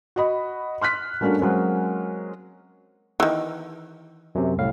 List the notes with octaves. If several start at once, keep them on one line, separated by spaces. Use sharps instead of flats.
F#4 D#5 B5
C6 F6 F#6 B6
G3 A3 A#3 C#4 D4 F#4
F#3 G#3 A#3 C4 C#4
D#3 E3
F#2 C3
C2 A2 F5